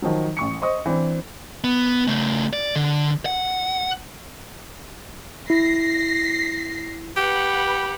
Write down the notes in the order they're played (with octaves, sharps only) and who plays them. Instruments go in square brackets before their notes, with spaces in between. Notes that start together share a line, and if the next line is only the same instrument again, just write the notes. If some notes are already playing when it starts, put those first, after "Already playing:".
[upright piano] D#3 F3 F#3
A1 C#6 C#7
C5 D#5 C#6 D#6
E3 C4 D4
[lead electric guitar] B3
C#3 A3
D5
D3
F#5
[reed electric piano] E4 [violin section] A#6 C7
[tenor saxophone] G4 [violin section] B4 F#5 B5